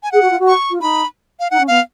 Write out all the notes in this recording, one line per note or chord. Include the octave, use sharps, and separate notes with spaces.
G#5
G#4 F#5
F#4
F4
F#4
C#6
F4
D#4 B5
F5
D#4 F#5
C#4
B3 F5